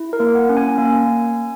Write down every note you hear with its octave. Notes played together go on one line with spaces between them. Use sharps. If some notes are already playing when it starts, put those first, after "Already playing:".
Already playing: E4
A#4
A#3
F#5
C#4
G#5
A#3